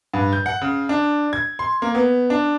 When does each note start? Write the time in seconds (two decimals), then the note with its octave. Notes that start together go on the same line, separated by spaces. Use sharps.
0.14 G2
0.33 G6
0.46 F#5
0.62 C#3
0.89 D4
1.33 G#6
1.59 C6
1.82 A#3
1.95 B3
2.30 D4